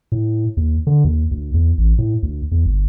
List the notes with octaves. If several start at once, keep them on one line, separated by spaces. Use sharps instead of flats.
A2
D#2
D3
D#2
D2
E2
A1
A2
D2
E2
G1